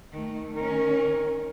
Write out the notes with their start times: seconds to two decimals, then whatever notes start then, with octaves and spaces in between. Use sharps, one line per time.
0.12 D#3 A3
0.55 D#3 C#4 A#4